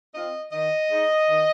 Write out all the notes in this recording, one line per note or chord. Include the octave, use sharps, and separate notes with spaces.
C4 F4 D#5
D#3 D#5
G#3 D#4
D#3